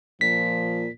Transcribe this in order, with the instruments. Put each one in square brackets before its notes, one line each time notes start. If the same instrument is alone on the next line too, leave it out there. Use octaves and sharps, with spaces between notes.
[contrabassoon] A#2 [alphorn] F3 [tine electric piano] B6